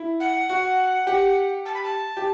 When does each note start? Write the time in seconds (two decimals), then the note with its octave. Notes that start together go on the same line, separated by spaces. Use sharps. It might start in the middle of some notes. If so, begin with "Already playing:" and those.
Already playing: E4
0.20 F#5
0.49 F#4
1.07 G4
1.65 A5
1.74 B5
1.83 A5
2.17 G4